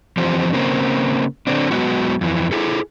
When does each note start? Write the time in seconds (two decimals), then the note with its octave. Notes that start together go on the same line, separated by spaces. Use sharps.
0.17 E3 F3 C4 F4 G4 C5
0.53 C#3 A#3 C4
1.47 D3 C4 D4
1.71 F#3 G#3 B3 E4 F#4
2.21 F2 E3
2.52 E4 G#4 A4